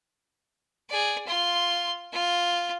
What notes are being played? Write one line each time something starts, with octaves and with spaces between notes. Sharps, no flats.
G#4 D5
F4 C6
F4